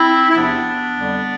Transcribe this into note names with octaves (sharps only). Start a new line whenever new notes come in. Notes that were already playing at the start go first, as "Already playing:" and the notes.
Already playing: C4 E4
E4
E2 C3 F3 B3 D4
F2 D3 G3